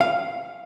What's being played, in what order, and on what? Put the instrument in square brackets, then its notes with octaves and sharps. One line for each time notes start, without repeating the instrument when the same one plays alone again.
[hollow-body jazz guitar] F5